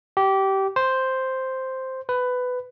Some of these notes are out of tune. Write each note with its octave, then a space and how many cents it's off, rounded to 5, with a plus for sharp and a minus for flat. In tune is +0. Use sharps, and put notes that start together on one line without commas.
G4 -20
C5 +0
B4 +15